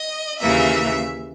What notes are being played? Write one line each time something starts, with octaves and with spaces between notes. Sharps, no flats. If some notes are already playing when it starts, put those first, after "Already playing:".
Already playing: D#5
D#2 C#3 E3 A#3 E5